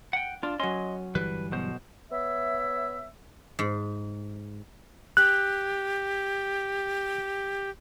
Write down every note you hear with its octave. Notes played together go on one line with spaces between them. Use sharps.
F#5 G5
D4 F4
F#3 C#4 D#5 C6
G1 E3 G3 B4
B1 B2 C5
B3 C#5 E5
G#2
G4 F#6